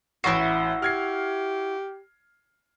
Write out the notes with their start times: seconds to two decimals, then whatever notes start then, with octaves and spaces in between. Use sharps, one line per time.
0.24 A1 E4 F#4 C7
0.82 G4 F6 G#6 C7